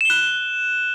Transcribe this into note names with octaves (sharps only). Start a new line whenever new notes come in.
F#6 E7 G7